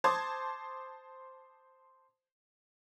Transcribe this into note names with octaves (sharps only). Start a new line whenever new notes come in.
C5 A5 C6 D6 D#6 G#6